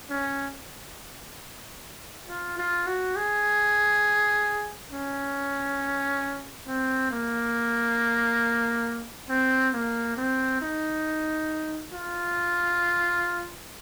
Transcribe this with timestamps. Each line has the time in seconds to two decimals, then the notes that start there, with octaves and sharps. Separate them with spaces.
0.09 C#4
2.28 F4
2.58 F4
2.87 F#4
3.16 G#4
4.91 C#4
6.67 C4
7.11 A#3
9.29 C4
9.74 A#3
10.17 C4
10.61 D#4
11.93 F4